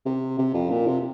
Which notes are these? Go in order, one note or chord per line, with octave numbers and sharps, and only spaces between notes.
C3
C3
F2
A#2
C3